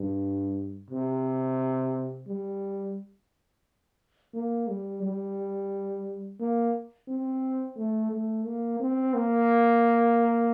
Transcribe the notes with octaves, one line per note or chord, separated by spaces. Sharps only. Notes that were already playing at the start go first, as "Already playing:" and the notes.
Already playing: G2
C3
G3
A#3
G3
G3
A#3
C4
A3
A3
A#3
C4
A#3